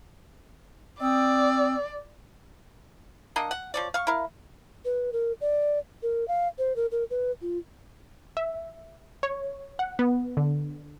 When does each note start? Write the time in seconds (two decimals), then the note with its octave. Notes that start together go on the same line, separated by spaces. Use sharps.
1.01 C4 D5 G5 D#6 E6
3.36 A#3 D4 D#5 F#5
3.51 F#5
3.74 F3 C#5 D5
3.94 F5 C#6
4.07 E4 A#4 F5
4.85 B4
5.13 A#4
5.41 D5
6.03 A#4
6.28 F5
6.58 C5
6.76 A#4
6.92 A#4
7.10 B4
7.42 F4
8.37 E5
9.23 C#5
9.79 F#5
9.99 B3
10.37 D3